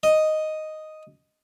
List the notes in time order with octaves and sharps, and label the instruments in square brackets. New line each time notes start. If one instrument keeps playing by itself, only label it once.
[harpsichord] D#5